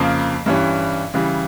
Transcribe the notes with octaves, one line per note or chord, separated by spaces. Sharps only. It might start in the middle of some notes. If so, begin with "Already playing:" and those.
Already playing: F2 C#3 F3 A#3
G2 E3 G3 C#4
C#3 E3 G3